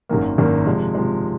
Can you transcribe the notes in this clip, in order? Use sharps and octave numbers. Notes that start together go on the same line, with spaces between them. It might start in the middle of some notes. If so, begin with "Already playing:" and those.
G#1 F#2 D#3 A#3
G#1 F#2 D#3 A#3
C3 F3 G#3
C3 F3 G#3